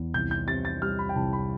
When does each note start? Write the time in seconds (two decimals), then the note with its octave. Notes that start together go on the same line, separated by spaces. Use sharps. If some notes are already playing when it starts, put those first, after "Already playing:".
Already playing: E2
0.14 C2 G6
0.31 G6
0.48 C3 A6
0.65 A6
0.82 G3 F6
0.99 B5
1.09 G5
1.16 C2 A5
1.33 B5